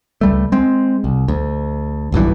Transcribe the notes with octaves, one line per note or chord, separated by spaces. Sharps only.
C#2 G3 A3
G#3 C4
C2
D2
D1 B1 G2 E3